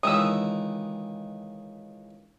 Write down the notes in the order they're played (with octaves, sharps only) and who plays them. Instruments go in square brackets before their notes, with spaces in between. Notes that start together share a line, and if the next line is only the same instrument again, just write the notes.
[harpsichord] C#2 D#3 E3 [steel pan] D#6 E6